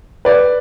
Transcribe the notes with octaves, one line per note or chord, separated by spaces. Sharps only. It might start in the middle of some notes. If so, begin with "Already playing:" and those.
B4 D5